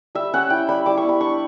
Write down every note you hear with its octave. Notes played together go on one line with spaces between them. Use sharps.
G3 E5
C#4 F#5
E4 G5
G3 B5
G3 D6
C#6
B3
B5
D4 C#6